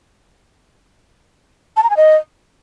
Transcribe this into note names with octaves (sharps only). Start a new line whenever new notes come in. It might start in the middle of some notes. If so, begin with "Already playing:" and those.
A5
A#5
G#5
D#5